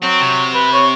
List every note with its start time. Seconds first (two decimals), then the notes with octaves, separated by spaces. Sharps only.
0.02 F#3 C4
0.21 C3
0.54 B4
0.73 C#5